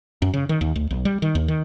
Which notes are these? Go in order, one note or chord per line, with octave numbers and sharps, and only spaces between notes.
F#2
C#3
D#3
D#2
D2
B1
G3
D#3
D#2
D#3